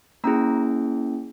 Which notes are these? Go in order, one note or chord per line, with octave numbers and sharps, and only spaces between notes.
A#3 C#4 E4 G#4 A#5